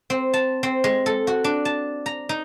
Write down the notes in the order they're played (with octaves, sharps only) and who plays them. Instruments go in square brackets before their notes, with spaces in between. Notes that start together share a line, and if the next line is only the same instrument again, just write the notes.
[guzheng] C4
A5
C4
G#3
A4
F#4
D4
A5
A#5
D#4